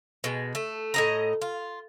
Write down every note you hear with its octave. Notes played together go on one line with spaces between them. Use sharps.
B2 G#3
A3
A2 D#5 A#5
F4